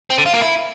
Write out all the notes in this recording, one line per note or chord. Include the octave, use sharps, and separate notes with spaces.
C4
D3
F4
A#3
E4